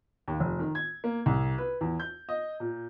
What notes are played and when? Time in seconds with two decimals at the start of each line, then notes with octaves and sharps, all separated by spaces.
0.28 D#2
0.40 F1
0.59 D#3
0.75 G#6
1.04 A#3
1.26 C2
1.58 B4
1.81 E2
2.00 G6
2.29 D#5
2.60 A#2